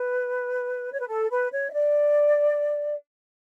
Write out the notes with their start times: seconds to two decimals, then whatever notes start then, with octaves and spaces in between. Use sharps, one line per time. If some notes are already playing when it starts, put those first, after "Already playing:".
Already playing: B4
0.91 C#5
1.00 B4
1.08 A4
1.29 B4
1.51 C#5
1.68 E5
1.73 D5